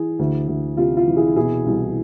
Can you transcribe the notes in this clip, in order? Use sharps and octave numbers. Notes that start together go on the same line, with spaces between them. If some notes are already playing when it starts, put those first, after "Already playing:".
Already playing: E3 E4 G#4
D2
D2
C3 F4
F4
E3
E4 G#4
B2 E4 G#4
C2